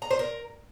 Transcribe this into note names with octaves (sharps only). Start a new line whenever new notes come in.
A#5
C5
A#4